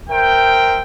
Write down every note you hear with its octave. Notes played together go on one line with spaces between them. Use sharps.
A#4 C5 E5 G5